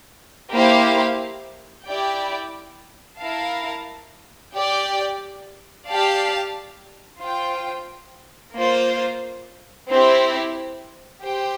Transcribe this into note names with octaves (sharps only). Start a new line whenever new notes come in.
A#3 E4 G4 C5 F5
E4 G4 D5 G5
E4 A#4 F5 A5
G4 D5 G5
G4 D5 F5 A5
F4 C5 G5
A#3 F4 C5
C4 E4 G4 C5
G4 C5 G5